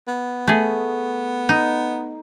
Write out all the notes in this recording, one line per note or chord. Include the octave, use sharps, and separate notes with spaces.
B3
A3 G#4
D#4